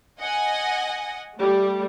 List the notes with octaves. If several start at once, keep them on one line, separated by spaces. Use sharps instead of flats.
D#5 F#5 G#5
G3 A3